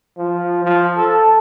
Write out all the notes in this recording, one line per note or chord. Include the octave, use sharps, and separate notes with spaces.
F3
F3
A4